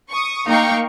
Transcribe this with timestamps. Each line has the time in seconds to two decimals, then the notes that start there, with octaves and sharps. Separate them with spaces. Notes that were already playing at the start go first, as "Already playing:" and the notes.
0.11 C#6 D#6
0.47 A#3 D#4 F5 G5 A#5 C#6